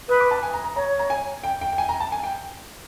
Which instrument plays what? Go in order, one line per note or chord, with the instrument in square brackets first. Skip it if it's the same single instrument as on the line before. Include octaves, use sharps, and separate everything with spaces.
[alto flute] B4 [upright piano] D#6
[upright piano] D6
A5
G#5
A#5
A#5
[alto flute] C#5 [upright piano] A#5
[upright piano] A#5
G#5
G5
G5
G5
G#5
A#5
A5
G#5
G5